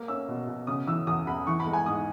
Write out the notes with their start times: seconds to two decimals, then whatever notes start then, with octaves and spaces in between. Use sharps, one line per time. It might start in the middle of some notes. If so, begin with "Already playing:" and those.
Already playing: A#3
0.08 C#4 E6
0.28 B2
0.47 B2
0.67 C#3 D#6
0.87 E3 E6
1.07 E2 D#6
1.27 E2 B5
1.47 E3 C#6
1.60 B5
1.66 G#3
1.73 G#5
1.86 G#2 D#6